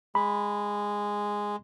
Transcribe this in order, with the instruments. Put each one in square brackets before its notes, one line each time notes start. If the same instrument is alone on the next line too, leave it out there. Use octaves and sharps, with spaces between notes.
[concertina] G#3 [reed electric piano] B5